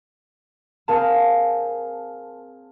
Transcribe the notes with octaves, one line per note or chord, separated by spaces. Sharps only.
C4 G#4 A#4 F5 G#5 A5